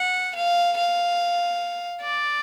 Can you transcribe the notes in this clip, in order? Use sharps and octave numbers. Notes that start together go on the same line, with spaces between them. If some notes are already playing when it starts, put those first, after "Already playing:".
Already playing: F#5
F5
F5
D5